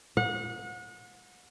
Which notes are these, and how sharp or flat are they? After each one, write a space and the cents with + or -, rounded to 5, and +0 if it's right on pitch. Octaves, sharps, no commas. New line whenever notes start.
F#5 -35